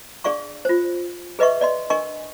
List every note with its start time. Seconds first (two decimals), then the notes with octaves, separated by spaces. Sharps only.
0.24 D4 G#4 D5 F5 C#6
0.65 F4 C5
1.39 G#4 B4 D#5 E5 C#6
1.61 D5 D#5 C6
1.90 D4 A#4 D#5 G#5 C#6